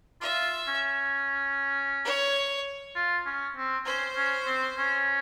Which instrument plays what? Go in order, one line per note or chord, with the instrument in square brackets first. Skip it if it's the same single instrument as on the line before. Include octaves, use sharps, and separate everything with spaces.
[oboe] F4 [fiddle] E5
[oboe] C#4
[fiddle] C#5
[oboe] F4
C#4
C4
[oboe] C#4 [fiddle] C5
[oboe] C#4
C4
C#4